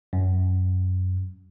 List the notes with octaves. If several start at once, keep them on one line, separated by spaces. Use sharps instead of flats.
F#2